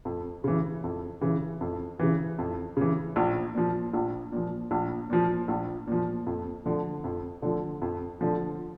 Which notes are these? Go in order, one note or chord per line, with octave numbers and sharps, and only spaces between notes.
F2
C#3 E3
F2
C#3 E3
F2
C#3 E3
F2
C#3 E3
A#1
A#2 F3
A#1
A#2 F3
A#1
A#2 F3
A#1
A#2 F3
F2
D3 F3
F2
D3 F3
F2
D3 F3